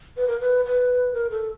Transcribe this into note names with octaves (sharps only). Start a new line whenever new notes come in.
B4
A#4
B4
B4
A#4
A4